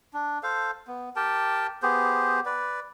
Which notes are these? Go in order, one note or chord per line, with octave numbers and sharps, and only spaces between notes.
D4
A4 C5 F5
B3
G4 A#4 G5 A5
B3 G4 G#4 C5
B4 D5